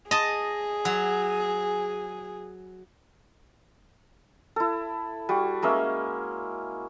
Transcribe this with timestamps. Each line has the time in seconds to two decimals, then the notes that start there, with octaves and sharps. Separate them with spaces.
0.11 G#4 D#5 A5
0.85 F#3
4.56 E4 A4
5.29 G3 F#4
5.62 G#3 A#3 C#4 E5